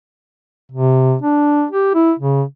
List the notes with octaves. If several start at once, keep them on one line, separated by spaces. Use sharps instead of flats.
C3
D4
G4
E4
C#3